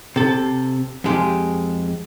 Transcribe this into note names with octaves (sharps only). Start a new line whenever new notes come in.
C3 A4
F2 G#3 G4